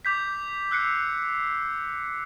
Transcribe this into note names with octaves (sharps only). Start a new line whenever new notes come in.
D6 G6 B6
E6 F#6 C7 C#7